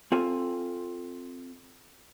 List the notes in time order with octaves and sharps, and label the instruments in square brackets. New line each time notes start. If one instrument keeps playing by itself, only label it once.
[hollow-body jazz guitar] C4 F4 A4 G#5